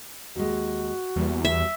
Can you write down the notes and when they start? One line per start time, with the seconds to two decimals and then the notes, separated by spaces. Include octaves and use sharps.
0.36 D#2 G#3 F#4
1.16 E2 G3 A#3
1.45 E5